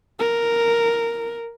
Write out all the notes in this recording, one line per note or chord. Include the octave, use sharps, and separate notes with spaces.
A#4